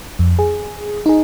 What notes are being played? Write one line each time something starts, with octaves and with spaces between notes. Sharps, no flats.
F2
G#4
D#4 G#4